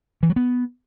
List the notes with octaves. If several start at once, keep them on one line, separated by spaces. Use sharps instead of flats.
E3
F#3
B3